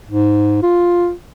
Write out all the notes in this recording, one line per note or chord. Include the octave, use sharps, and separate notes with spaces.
G#2
F4